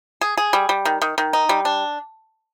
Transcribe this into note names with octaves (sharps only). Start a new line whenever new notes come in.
G#4
G#4
G3
G3
D#3
D#3
D#3
D#4
G3
D4